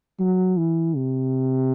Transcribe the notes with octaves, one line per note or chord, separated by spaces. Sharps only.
F#3
E3
C3